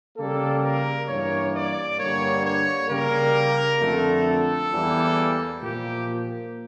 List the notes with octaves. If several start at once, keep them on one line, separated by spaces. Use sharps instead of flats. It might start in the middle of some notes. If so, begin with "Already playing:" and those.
C#3 G3 A#3 A4
A#4
G2 E3 A#3 C#5
D5
G2 D3 G3 A#3 C#5
C#5
C#3 G3 A#3 A#4
F2 D3 A3
A4
E2 E3 G3 A#3
A#2 F3 A#3 G4